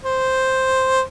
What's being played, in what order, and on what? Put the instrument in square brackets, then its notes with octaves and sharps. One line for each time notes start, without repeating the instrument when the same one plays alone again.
[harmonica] C5